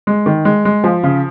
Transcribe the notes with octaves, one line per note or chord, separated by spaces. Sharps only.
G#3
D#3
G#3
G#3
F3
C#3